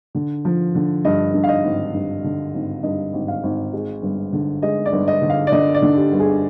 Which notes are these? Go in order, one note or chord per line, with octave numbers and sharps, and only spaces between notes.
D3
F3
D3
G2 D#5
G2
F5
D#5
G#1
G2
D3
G#1
G2 D#5
G#1
F5
G#1
G#3
G1
D3
G#3 D#5
D5
G1
D#5
D3
F5
D5
D3 D#5
D5
D3
G4
G1
G#4